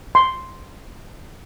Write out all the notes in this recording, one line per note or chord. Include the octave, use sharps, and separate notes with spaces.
C6